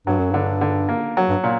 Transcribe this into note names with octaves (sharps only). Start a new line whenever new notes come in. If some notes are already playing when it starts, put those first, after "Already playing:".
G2 F#3
F#2
G2 D3
D3
A#3
F#3
G2
A#2